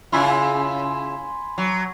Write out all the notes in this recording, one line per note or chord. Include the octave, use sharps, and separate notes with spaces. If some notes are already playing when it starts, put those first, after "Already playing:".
C#3 E4 F4 G#5 B5 C6
F#3